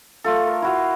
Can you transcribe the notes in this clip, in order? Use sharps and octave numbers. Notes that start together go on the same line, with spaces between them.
A3 F4 A4
A#4
E4 F#4 F5